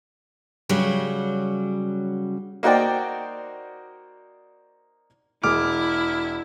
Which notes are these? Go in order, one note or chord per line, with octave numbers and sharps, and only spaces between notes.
C#3 F#3 G3 F#4
A#3 D#4 F#4 C5 D5 G5
E1 E4 G#4 D6 F6